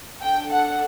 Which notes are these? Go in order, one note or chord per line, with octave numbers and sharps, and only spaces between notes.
D4 A4 G5
F#5